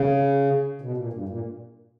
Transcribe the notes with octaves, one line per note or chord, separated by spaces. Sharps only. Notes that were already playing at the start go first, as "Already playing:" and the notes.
Already playing: C#3
B2
A#2
G2
A#2